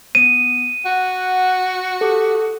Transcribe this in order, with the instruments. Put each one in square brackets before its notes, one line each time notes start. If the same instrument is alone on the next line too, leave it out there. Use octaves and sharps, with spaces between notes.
[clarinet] B3 [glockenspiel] D#7
[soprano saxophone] F#4 [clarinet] F#5
[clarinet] G4 [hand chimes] A4